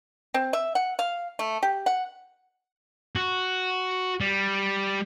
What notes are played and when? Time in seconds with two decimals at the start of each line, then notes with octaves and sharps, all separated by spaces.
0.34 C4
0.53 E5
0.75 F#5
0.99 F5
1.39 A3
1.63 G4
1.86 F#5
3.16 F#4
4.21 G3